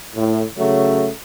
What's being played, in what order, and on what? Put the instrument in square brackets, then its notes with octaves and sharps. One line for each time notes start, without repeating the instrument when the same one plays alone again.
[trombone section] A2
C#3 F#3 A3